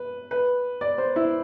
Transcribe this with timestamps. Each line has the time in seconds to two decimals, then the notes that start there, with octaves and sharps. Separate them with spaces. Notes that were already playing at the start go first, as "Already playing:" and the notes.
Already playing: B4
0.31 B4
0.81 D5
0.98 C5
1.16 E4